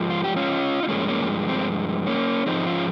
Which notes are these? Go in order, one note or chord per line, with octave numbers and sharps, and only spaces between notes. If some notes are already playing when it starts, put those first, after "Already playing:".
Already playing: G#2 F3 G#3
F4
G4
C#4 F4
D#4
G2 F3 G#3 A#3 C#4
A#3 C#4
C4
A#3 C#4
G#2 F3 G#3 C4 D#4
C#4 F4